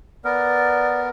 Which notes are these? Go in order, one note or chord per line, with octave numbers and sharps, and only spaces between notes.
B3 A#4 D5